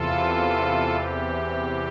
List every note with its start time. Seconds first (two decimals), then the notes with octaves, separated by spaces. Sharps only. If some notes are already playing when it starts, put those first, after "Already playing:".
Already playing: E2 C3 E3 F4 A4
0.91 G4